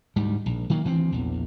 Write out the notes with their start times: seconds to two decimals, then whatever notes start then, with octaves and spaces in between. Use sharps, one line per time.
0.16 D2 G#2 G3
0.46 A#1
0.70 D#3 F#3 A#3
0.84 D2 E3 G#3 C4
1.12 A#1 E2